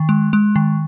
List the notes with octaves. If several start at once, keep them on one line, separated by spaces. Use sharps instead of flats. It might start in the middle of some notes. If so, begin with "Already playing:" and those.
Already playing: D#3
G#3
G#3
D#3